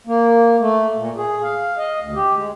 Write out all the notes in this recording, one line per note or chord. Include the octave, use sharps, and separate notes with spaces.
A#3
A3
A#2
G#4
F5
D#5
D2
G4
G#3